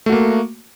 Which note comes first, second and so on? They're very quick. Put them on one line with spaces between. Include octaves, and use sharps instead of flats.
A3 F#4 A#3